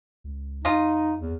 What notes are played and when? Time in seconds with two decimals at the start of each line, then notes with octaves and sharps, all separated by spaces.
0.24 C#2
0.65 F2 D#4 F4 D#5
1.20 E2